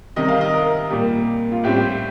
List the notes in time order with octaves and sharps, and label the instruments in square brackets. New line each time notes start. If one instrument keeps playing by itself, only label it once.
[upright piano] C3 D#3 G3 D#5
F5
D#5
A#4
A#2 G3 A#3
F4
A2 G3 C4 G4